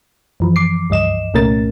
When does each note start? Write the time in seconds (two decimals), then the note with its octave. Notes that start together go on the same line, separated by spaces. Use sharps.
0.40 F#2 E3 F3
0.56 D6 C7
0.90 C#2 G2 D#5 E7
1.34 C2 A#2 A3 C#4 A#4 A6